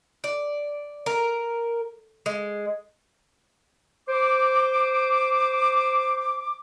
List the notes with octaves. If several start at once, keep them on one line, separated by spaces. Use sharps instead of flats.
D5
A#4
G#3
C5 D6